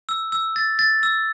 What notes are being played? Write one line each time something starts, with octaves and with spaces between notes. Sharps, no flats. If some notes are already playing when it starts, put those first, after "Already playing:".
E6
E6
A6
A6
E6